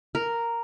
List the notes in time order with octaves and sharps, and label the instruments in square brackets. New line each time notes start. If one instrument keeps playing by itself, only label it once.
[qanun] A#4